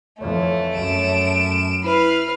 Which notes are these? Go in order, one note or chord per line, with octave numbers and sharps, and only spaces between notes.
F2 E3 A3 C#5
F#2 D7 E7
E4 B4 F6 C7